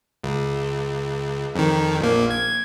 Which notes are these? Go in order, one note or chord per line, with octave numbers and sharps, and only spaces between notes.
C#2
F2 D#3
A#1 A#3
G#6